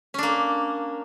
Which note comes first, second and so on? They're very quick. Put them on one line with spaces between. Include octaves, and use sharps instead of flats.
C#4 D4 A#3